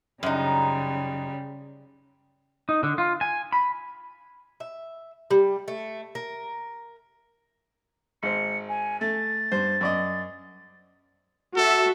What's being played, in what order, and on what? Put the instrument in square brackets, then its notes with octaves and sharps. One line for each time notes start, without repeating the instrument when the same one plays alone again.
[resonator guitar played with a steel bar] F#2 D#4 [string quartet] C#3 G3
[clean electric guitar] D#4
D3
F4
G#5
B5
[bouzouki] E5
G3
A3
A#4
[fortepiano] G#1 C5 [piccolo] C#7
[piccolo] G#5
[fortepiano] A3 [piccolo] A6
[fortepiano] G2 C5
F#2 D5 D#5
[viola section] F#4 E5 [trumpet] A4